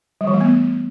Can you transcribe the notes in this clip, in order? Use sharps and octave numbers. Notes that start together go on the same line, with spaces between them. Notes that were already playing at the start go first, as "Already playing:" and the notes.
G3
E3
A3
B3